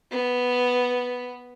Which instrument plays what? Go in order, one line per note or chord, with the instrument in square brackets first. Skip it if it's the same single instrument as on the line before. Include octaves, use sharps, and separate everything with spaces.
[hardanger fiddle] B3